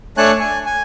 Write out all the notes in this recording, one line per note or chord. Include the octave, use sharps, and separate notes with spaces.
A3 D4 C#5 G#5 A5 F#6
G#5
G#5